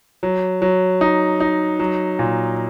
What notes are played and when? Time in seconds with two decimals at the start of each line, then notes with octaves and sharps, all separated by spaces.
0.23 F#3
0.62 F#3
1.01 D#4
1.40 D#4
1.79 F#3
2.19 A#2